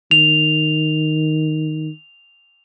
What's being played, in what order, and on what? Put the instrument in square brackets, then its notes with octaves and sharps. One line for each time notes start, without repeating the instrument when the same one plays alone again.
[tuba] D#3 [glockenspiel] F7